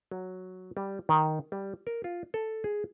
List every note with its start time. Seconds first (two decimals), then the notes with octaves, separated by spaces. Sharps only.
0.11 F#3
0.77 G3
1.09 D#3
1.52 G3
1.87 A#4
2.04 F4
2.34 A4
2.64 G#4